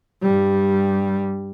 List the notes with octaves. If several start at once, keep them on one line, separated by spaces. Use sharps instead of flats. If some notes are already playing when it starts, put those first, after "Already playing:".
G2 G3